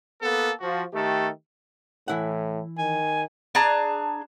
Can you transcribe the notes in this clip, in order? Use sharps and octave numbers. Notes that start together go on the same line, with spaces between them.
A#3 B3 A4
F3 F#4
D#3 A3 G4 A4
A2 E3 E4 F#5
D#3 G#5
D4 G#4 A5 A#5